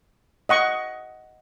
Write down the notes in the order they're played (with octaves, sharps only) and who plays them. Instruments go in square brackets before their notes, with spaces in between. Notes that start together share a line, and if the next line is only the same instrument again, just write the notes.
[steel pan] D#5 F#5 C#6